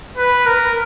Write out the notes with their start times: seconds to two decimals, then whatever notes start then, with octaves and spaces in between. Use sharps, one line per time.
0.17 B4
0.46 A#4